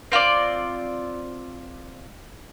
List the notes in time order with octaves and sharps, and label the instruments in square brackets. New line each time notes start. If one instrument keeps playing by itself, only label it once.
[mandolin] C4 F4 A4 D5